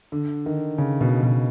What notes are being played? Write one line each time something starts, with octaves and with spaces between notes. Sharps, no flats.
D3
D#3
C#3
B2
B2